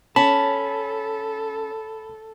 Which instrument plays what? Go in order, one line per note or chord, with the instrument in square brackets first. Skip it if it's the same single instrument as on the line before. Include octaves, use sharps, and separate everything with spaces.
[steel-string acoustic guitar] C#4 [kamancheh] A4 [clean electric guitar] A5 [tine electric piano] B5